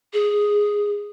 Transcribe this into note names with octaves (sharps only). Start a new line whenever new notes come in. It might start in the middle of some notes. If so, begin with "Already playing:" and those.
G#4